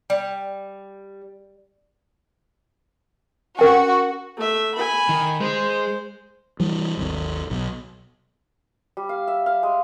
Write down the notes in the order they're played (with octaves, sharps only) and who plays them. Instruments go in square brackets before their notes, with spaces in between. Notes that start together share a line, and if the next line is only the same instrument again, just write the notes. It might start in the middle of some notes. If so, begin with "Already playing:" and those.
[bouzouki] G3
[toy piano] C#4 A#4 G5 [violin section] F#4
[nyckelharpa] A3 E5
G#5 B5
[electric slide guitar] D#3
[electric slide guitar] G#3 G#4 [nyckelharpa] C5
[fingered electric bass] E3 G3
G#1 D#2
B1
[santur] G3
F5
E5
F5
G#3